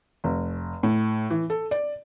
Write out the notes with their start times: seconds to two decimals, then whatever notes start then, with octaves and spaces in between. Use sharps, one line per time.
0.24 F1
0.83 A2
1.30 E3
1.50 A4
1.71 D5